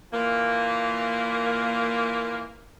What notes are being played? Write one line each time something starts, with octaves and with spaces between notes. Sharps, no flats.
A#2 E3 A#3